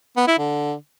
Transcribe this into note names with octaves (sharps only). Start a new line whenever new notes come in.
B3
E4
D3